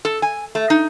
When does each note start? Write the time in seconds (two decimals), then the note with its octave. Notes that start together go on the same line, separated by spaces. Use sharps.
0.05 A4
0.22 G#5
0.55 A3
0.70 D#4